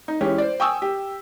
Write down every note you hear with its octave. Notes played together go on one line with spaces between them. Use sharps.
D#4
E3 G#3 C#4 G4
C5 D5
G5 G#5 C#6 D#6 E6
G4